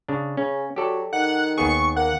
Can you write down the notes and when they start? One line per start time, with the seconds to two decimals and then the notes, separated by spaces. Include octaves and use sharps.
0.09 C#3 D4
0.37 C#3 C#4
0.76 F#3 G4 A4 D5
1.13 D#3 F#5
1.58 D#2 B3 G#4 C#6
1.96 A#3 F#5